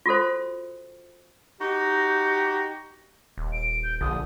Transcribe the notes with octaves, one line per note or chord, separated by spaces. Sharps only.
F4 F#4 A4 C5
D#4 F#4 G4
D#1
D7
G6
A#1 D3 D#6